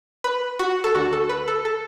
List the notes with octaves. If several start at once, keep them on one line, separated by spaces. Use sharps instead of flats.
B4
F#4
A4
D2 D3 F#4
A4
B4
A4
A4